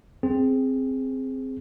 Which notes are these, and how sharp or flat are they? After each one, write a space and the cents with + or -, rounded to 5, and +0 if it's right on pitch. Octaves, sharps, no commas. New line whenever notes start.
C4 +0 G#4 +0